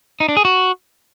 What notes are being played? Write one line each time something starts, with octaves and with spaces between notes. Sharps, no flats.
D#4
D4
G#4
F#4